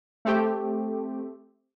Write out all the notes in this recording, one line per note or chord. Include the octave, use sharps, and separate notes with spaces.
A3 C4 G4